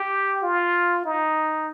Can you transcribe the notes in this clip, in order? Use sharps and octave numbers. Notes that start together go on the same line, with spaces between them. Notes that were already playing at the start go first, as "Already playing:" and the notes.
Already playing: G4
F4
D#4